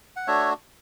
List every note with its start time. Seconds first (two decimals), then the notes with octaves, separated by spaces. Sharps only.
0.16 F#5
0.27 A3 D4 F#4 C#5 E5